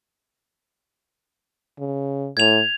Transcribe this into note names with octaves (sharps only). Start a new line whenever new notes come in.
C#3
A2 G#6 F7